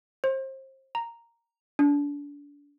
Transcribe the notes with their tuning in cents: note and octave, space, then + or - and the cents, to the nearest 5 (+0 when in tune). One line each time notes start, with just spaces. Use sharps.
C5 +30
A#5 -5
D4 -30